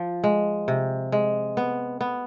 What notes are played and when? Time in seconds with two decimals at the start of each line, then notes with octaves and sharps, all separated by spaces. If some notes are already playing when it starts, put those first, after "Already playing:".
Already playing: F3
0.24 G#3
0.68 C3
1.12 G#3
1.57 B3
2.01 B3